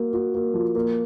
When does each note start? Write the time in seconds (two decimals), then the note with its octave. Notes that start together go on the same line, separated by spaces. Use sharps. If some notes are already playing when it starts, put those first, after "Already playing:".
Already playing: A#3 F#4
0.13 F#4
0.34 A#3
0.54 F3
0.75 A#3